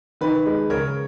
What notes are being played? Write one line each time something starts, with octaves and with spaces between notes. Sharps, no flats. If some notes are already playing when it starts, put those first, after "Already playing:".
D#3 B4
G#3
C#3 A#4 C#5